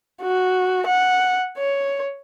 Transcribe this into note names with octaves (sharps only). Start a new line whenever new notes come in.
F#4
F#5
C#5